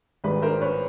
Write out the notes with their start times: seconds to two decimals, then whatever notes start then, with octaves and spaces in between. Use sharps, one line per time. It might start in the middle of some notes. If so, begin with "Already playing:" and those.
0.24 G#1 G#2 D#3 G3 B4
0.42 A#4 C5
0.61 B4 C#5